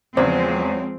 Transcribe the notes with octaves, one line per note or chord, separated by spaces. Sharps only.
E2 C#3 F3 F#3 G#3 C4 C5